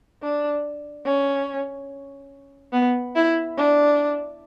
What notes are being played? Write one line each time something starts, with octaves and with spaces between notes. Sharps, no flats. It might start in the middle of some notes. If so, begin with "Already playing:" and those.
D4
C#4
B3
E4
D4